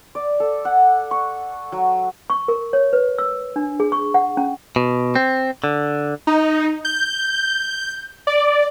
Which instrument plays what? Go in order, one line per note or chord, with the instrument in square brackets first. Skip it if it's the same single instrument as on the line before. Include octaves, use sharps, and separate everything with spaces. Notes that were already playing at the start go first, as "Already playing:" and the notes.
[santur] D5
A4
F#5
C#6
F#3
[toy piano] C#6
A#4
C#5
B4
E6
D4
G#4
C#6
F#5
C#4
[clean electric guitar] B2
C4
D3
[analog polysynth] D#4
G6
D5